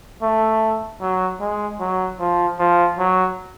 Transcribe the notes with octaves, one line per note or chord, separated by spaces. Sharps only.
A3
F#3
G#3
F#3
F3
F3
F#3